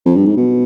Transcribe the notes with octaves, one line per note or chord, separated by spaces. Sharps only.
F2
G2
G#2
B2